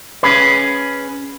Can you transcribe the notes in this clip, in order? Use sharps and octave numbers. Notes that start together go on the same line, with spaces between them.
C#4 G#4 B4